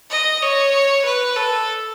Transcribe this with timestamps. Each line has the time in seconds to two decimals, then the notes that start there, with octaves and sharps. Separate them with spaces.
0.11 D#5
0.42 C#5
1.05 B4
1.36 A4